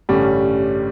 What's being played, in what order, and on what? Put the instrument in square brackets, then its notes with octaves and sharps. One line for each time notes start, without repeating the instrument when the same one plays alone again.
[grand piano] A1 G2 D3 G3 C#4